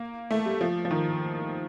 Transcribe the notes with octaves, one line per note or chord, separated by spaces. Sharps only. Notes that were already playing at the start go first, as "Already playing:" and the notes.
Already playing: A#3
A3
G3
F3
F3
D#3